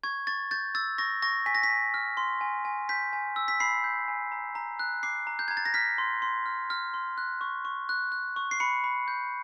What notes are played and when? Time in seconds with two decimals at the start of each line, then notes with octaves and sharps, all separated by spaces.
0.03 C#6 G#6
0.27 C#6 A6
0.51 G6 A6
0.75 E6 A6
0.98 C#6 A#6
1.22 C#6 A#6
1.46 G#5 B6
1.55 A#6
1.63 B6
1.70 G#5
1.94 F6
2.17 C6
2.41 G#5
2.65 G#5
2.89 G6 B6
3.13 G#5
3.36 E6
3.48 B6
3.60 B5 C7
3.84 G6
4.08 G#5
4.32 A#5
4.55 A#5
4.79 F#6
5.03 D6 C7
5.27 A#5
5.39 G6
5.48 A#5 G#6
5.57 A6
5.65 A#6
5.74 F6 B6
5.98 C6
6.22 C6
6.46 F6
6.70 F6
6.94 C6
7.18 F#6
7.41 C#6
7.65 C#6
7.89 F#6
8.12 F#6
8.36 C#6
8.51 C7
8.60 B5 C#7
8.84 B5
9.08 G6